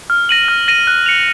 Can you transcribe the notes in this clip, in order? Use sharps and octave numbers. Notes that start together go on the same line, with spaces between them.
F6
A#6 D#7 F#7
F6
A#6 D#7 F#7
F#6
C#7 F7